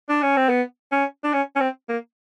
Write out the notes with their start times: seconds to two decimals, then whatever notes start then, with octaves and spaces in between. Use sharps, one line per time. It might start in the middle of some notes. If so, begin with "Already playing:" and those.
0.09 D4
0.22 C#4
0.36 C4
0.49 B3
0.92 C#4
1.24 D4
1.33 C#4
1.56 C#4
1.60 C4
1.89 A#3